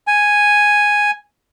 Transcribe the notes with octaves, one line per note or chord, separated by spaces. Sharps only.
G#5